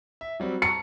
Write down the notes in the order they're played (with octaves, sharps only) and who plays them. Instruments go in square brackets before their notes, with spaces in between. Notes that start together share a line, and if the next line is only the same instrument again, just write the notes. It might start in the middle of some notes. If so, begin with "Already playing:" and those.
[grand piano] E5
F#3 G3 C4
[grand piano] A5 A#5 C#6 [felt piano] C#7